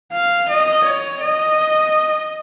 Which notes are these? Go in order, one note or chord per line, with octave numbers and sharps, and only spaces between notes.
F5
D#5
C#5
D#5